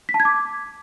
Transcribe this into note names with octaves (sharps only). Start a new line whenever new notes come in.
B6
A5
G#6
D6